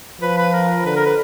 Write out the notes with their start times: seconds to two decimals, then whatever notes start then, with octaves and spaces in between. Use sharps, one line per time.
0.21 F3 B4
0.37 B4
0.53 A#4
0.84 D3 B4
0.96 A#4
1.06 B4